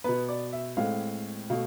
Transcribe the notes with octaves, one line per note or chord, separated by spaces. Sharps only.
B2 B3 B4
D5
E5
A2 G#3 C4 F5
B2 A3 F5